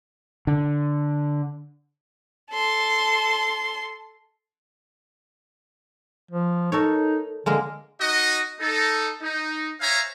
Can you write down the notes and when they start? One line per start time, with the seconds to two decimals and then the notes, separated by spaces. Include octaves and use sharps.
0.47 D3
2.52 A4 C6
6.31 F3
6.72 D#4 A4 A#4 C#5
7.46 D3 G#3 A#3 A#4
8.01 D#4 F#4 D#5
8.60 D#4 A4
9.22 D#4
9.81 C5 C#5 E5 F5 G#5 A#5